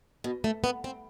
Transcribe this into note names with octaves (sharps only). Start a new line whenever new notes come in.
B2
A3
B3
C4